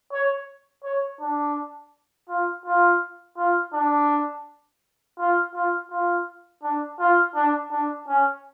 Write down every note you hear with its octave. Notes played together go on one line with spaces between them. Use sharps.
C#5
C#5
D4
F4
F4
F4
D4
F4
F4
F4
D4
F4
D4
D4
C#4